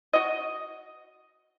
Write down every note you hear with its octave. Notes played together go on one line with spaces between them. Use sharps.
F#4 D#5